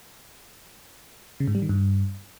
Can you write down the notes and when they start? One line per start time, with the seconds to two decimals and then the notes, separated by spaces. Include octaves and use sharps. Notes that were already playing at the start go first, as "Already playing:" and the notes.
1.40 C#3
1.48 G#2
1.55 G3
1.62 D#3
1.69 G2